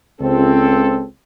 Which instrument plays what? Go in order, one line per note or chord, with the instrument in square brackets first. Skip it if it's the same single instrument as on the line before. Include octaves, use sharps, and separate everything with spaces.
[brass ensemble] C#2 C4 A4